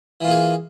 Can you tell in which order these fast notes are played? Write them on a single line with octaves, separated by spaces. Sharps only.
E3 F4 A#3 G#4